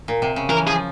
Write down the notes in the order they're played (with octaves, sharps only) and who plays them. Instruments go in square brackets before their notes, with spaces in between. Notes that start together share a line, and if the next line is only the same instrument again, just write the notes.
[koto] A#2
C3
C#3
[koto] E3 [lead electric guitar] A#4
[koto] F3 [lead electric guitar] G#4